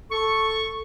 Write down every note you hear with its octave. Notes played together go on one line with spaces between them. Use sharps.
A4 C#6